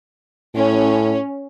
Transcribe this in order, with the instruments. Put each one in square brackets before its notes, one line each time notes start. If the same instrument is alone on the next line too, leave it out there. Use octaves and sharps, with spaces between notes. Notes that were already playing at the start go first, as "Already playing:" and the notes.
[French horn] A2 [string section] C#4